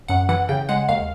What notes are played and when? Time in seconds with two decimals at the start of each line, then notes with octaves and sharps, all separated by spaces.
0.08 F#2 F#5
0.29 E3 F#5
0.49 C#3 G5
0.69 G#3 F#5
0.89 D#2 F5